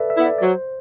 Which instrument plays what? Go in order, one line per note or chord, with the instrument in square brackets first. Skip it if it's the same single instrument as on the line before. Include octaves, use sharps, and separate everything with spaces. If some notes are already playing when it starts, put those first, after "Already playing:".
Already playing: [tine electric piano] A4 B4 D5 E5
E5
[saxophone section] B3 E4
[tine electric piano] D5
D5
[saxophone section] F#3 [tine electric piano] C5